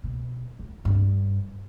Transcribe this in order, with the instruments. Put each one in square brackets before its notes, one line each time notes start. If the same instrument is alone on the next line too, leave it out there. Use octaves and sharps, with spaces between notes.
[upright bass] B2
E2
G2